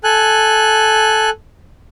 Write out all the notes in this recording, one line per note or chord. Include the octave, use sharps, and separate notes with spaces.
A4 G#5 F#6